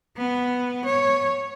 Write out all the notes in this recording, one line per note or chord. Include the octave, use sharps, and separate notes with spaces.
B3
C#5